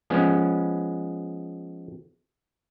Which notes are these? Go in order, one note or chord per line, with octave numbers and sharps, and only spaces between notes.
F3 G#3 B3 C#4